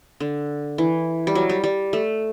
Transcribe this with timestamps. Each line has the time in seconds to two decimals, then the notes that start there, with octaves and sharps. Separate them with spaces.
0.20 D3
0.78 E3
1.27 G3
1.35 F#3
1.50 G3
1.64 G3
1.93 A3